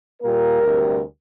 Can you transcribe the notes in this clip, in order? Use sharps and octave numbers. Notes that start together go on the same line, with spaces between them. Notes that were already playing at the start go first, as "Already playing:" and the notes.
A#2 G3 A#3 A#4
D2 C3 G3